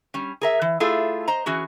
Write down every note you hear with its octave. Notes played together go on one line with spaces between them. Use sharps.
G3 C#4
G#4 A#4 E5
E3
A3 E4 F4 G#4 A4
C5 D#5 A#5
E3 C#4 F#4 G#4